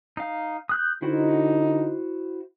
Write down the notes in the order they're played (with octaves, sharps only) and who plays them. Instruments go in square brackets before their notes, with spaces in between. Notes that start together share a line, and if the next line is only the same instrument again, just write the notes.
[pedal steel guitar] D#4 F5
D#6 F#6 G6
[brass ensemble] D3 D#4 [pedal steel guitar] E4 F#4 C5